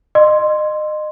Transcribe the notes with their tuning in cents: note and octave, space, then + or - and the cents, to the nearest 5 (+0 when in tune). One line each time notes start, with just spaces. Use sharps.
D#5 -30 C6 +0